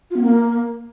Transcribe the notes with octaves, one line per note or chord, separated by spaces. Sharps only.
F4
B3
A#3